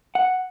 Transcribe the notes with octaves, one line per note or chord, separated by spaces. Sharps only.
F#5